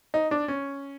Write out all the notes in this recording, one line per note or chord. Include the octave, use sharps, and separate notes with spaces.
D#4
D4
C#4